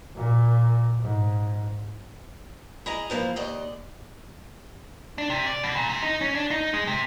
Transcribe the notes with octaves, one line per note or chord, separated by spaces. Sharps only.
A#2
G#2
E4 G#4 D#5 A#5
E3 F3 A#3 E4
D#2 D5 D#5
D4
C3
D5
B2
A#2
C3
D#4
C#4
D4
D#4
G#3
C3